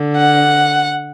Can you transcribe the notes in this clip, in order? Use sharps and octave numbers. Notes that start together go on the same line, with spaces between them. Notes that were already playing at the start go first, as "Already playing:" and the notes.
Already playing: D3
F#5